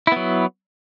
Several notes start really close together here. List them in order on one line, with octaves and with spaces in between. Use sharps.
E4 B3 F#3